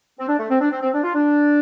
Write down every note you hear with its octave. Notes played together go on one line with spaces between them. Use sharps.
C4
D4
A3
C4
D4
C4
C4
D4
F4
D4